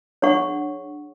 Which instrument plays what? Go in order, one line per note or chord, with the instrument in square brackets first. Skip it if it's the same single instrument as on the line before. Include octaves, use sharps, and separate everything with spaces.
[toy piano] D4 G#4 C#5 F#5 C#6